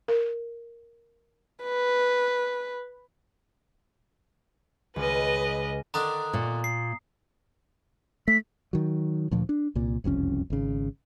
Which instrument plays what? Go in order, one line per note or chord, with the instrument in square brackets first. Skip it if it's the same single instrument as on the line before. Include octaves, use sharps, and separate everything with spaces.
[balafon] A#4
[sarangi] B4
[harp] C#2 [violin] B4 D#5
[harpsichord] D3 D#3 D4 [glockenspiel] A#5 D#6
[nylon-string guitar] A#2
[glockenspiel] C7
[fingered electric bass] A3 [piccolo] B6
[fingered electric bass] D#3 F#3
D2 A#2 F3
D4
C2 A#2
F#1 C2 F2 C#4
G#1 C#3